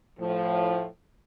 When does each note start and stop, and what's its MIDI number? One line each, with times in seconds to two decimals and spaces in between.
0.20 0.86 45
0.20 0.86 53